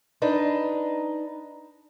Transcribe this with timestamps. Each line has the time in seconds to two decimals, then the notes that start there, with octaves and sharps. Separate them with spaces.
0.22 D4 D#4 B4